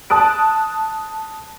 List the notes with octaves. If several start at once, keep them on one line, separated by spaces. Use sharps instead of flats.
A5 D#6 F#6 D7